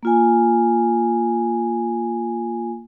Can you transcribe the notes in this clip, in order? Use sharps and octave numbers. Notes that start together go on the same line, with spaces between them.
A#3 F4 G#5